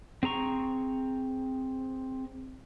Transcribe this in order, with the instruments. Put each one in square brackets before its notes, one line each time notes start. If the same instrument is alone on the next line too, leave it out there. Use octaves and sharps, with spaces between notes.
[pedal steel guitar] C4 G#4 A#5 C#6